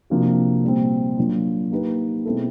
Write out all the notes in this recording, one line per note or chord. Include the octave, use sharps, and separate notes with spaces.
C3 F3 A#3 D4 F#4
A#2 G3 C4
F#3 A#3 D4 F4
A#3 D#4 G4 B4
B2 G#3 C4 E4 A4